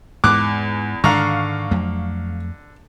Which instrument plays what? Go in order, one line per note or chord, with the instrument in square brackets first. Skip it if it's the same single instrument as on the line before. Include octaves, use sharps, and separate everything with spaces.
[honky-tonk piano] E2 [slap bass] G#2 G#3 [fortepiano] D6 F#6
[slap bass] G#2 D#3 G#3 [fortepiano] D3 A#5 [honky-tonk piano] F5 C#6
[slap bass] F2 F#3 A3